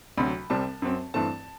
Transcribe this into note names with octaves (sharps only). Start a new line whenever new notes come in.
D2 C3 F#3 B5
C2 C3 G3 C4 A5
F#2 F#3 C4
G2 E3 A3 C4 A5